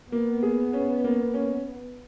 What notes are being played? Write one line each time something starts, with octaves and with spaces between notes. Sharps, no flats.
A#3 B3
G#4
C#4
A#3
C#4